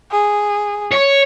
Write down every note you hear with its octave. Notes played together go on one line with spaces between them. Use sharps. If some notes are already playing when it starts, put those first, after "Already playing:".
G#4
C#5